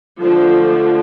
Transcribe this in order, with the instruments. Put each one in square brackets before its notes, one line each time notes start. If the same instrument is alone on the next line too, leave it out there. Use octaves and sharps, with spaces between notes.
[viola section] D3 F3 A3 D4 C5